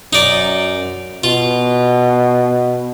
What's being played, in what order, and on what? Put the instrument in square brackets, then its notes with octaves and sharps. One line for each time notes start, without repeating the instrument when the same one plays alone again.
[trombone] F#2 [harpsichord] D#4 D5
[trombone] B2 [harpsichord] F4